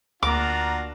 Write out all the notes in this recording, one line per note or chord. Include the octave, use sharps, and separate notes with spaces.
D2 A#3 D4 F4 F#4 A#4 A#5 D6